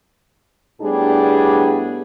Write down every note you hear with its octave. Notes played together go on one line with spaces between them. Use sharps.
A2 G3 B3 D4 G4 G#4